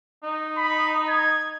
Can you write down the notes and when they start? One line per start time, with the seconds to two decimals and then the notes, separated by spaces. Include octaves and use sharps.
0.23 D#4
0.58 B5
1.09 G#6